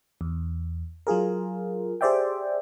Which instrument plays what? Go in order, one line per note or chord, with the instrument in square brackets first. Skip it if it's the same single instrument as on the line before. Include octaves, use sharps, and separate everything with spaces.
[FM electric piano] E2
F#3 F4 G#4 A#4
G4 G#4 C5 D5 E5 G5